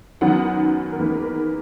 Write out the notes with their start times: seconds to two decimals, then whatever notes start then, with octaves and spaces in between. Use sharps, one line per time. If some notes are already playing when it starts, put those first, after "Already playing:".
0.21 F#2 D#3 F#3 B3 F#5
0.92 A#4
0.98 E2 D#3 A#3 B4
1.14 A#4
1.24 B4